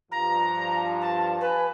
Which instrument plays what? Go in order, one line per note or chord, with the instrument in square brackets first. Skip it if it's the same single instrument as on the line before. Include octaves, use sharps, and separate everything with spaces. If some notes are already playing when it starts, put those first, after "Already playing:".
[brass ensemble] G2 F3 [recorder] A#5
[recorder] A5
[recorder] B4 [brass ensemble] G#5